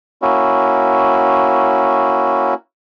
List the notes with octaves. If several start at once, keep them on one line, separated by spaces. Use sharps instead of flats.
A#3 C#4 E4 F#4